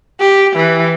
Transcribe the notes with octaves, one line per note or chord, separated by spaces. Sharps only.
G4
E3